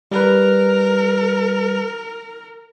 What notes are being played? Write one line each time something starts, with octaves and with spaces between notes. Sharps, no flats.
G3 A#4 B4